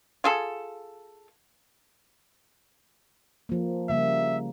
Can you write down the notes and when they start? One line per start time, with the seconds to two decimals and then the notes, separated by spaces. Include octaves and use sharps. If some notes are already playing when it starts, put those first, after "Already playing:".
0.24 F4 G#4 A4
3.49 F3 A#3
3.89 C#3 G3 A#3 E5